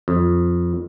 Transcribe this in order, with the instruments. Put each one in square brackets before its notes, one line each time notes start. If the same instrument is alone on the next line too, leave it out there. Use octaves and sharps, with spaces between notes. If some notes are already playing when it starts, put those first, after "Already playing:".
[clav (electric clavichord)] F2